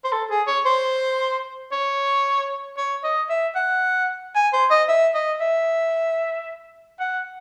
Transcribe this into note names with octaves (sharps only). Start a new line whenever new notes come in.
C5
A4
G#4
C#5
C5
C#5
C#5
D#5
E5
F#5
G#5
C5
D#5
E5
D#5
E5
F#5